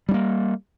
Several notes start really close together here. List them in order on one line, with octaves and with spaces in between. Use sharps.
G3 D4 A#3